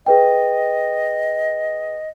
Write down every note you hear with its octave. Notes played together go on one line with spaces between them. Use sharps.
G#4 B4 D#5 G5